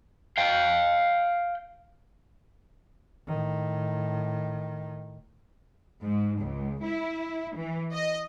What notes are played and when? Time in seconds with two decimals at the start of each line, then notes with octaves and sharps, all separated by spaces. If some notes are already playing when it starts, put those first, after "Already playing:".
0.38 F5 G5
3.27 A2 D#3
6.02 G#2
6.39 C#2
6.83 E4
7.56 E3
7.93 D#5